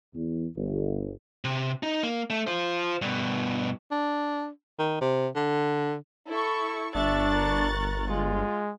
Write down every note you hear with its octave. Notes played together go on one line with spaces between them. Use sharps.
E2
G1
C3
D#4
A#3
A3
F4 C5
G2 B2
D4
D#3
C3
D3
E4 A4 C#6
G1 D4 E5 C#6 F#6 A6
A#4
G#3 F4